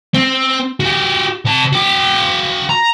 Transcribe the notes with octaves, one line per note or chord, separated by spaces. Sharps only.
C4
F#4 G4
C3 A5
F#4 G5
A#5